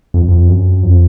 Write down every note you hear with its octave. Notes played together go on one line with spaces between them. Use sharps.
F2
F2
F#2
F2